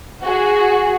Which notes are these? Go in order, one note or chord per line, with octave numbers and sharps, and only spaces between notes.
F#4 G#4